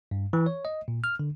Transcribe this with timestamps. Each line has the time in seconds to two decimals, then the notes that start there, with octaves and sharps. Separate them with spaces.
0.11 G2
0.33 E3
0.46 C#5
0.65 D#5
0.88 A#2
1.04 F6
1.20 D3